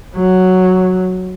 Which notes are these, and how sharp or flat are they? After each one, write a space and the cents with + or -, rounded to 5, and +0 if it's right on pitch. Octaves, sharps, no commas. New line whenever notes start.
F#3 +0